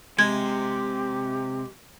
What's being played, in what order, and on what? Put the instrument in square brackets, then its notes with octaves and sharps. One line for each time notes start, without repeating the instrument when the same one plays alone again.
[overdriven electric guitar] C3 [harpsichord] G#3 [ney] G4 [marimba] G#6